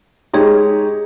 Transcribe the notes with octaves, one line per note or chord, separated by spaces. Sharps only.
G#3 D#4 G4 G#4 C#5